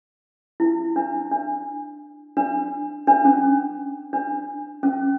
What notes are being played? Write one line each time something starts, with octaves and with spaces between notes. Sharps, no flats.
E4
D4
D4
D4
D4
C#4
D4
C#4